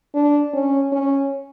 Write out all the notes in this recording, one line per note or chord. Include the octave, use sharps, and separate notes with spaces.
D4
C#4
C#4